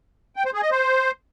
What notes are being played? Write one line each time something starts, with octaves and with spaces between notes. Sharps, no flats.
G5
C5
G#4
D#5
C5